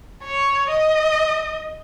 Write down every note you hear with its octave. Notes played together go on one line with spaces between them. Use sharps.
C#5
D#5